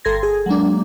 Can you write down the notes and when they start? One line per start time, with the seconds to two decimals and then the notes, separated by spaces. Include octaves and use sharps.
0.05 G1 A4 C6 G#6 A#6
0.23 G#4
0.46 F#3 G#3 A#3 D4